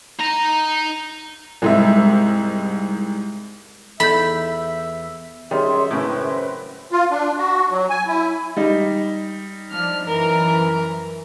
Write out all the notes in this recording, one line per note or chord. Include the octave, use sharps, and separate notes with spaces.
D#4 A#5
C2 G#2 E5
E2 A4 E5 B5 G6
F#2 D#3 G3 G#4 C#5 E5 C6
A2 C#3 B4
F#2 C4
F4
D4
F#4
F#3
G#5
E4
G3 D#4
F3 D4 F6
F#2 E3 A#4